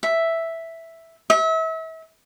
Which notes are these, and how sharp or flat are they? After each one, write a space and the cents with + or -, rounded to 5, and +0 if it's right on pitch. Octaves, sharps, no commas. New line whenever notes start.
E5 +0
E5 -35